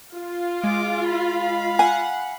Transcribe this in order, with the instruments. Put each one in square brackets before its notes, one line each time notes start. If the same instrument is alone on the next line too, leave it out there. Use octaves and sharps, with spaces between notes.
[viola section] F4
[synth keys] G#3 [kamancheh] D6
[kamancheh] F5 B5
[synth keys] F#5 [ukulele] G#5